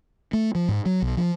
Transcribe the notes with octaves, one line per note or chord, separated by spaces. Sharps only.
A3
F3
G#2
F#3
B1
F3